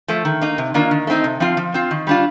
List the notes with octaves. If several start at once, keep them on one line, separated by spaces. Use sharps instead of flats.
F3 A3
D#3
A#3 D#4
C3
D#3 A#3 D4 F4
D#3
A3 C4 D#4
C3
F3 C4 F4
F3
C4 F4
D#3
G3 D4 F4